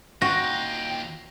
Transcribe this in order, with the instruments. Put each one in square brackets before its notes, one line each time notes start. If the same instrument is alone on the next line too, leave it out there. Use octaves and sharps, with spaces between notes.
[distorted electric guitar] D#2 F4 [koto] F#4 [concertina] G5 [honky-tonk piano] A#6